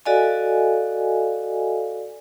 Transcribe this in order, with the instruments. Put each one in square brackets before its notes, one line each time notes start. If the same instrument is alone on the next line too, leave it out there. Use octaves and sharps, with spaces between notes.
[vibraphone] F#4 A4 D5 D#5 F5 G#5